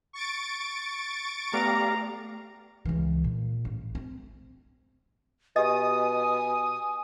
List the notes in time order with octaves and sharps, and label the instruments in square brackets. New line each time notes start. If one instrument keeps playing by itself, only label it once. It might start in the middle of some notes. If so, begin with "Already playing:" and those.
[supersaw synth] C#6 A6 D7
[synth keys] A3 B3 [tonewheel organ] G4 D5 F5 [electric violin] A#5
[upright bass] C#2 E3
A#2
A1
C4
[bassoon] B2 [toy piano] G4 D#5 [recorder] G#5 [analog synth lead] D#6